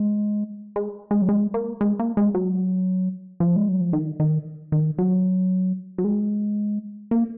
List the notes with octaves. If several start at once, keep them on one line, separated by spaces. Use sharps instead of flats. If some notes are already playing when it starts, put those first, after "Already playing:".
Already playing: G#3
G#3
G#3
F#3
G#3
A#3
G#3
A#3
G#3
F#3
F3
G#3
F#3
F3
D#3
D#3
D#3
F#3
F#3
G#3
A#3